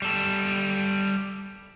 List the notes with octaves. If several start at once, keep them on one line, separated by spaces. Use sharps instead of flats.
G3 A4